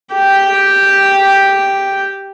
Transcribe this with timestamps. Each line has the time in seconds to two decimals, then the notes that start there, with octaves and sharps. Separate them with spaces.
0.14 G4 G5